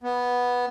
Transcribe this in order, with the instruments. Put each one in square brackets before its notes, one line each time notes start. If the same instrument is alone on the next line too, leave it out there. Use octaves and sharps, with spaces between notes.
[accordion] B3